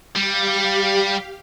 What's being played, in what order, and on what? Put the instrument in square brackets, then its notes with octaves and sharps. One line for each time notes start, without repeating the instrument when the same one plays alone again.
[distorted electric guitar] G3 [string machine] G4 F5